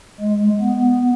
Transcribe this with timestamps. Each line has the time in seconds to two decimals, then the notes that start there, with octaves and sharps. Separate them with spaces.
0.21 G#3
0.60 B3